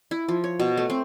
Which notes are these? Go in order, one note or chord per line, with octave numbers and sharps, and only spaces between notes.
E4
F3
C#5
B2
A3
C4